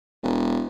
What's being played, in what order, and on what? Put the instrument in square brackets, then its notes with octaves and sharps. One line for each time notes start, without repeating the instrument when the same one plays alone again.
[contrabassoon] E1